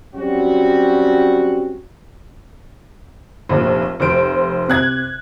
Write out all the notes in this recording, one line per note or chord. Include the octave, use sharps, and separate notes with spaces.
F#3 G3 C4 C#4 F#4
F1 A#1
F1 C5 D7
C3 F#6 G#6